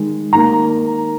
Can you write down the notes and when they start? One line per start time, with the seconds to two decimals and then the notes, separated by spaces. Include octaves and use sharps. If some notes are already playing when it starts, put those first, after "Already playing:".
Already playing: D#3 G#3
0.33 D#3 A#3 A#5